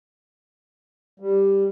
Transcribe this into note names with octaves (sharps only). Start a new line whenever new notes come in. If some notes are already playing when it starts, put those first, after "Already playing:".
G3